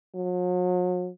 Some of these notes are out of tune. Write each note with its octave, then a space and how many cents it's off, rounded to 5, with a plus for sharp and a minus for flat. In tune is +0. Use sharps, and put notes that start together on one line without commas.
F#3 -45